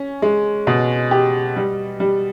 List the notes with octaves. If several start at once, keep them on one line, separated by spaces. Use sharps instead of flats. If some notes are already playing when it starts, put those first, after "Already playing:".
Already playing: C#4
G#3
B2
G4
G3
G3